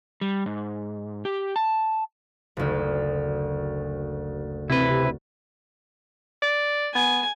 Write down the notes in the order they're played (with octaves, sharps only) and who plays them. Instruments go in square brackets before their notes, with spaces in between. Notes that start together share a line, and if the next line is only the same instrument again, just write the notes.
[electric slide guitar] G3
G#2
G4
A5
[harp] F#1 D2
[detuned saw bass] C3 [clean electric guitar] E4 B4
[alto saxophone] D5
[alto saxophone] B3 [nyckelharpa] G#5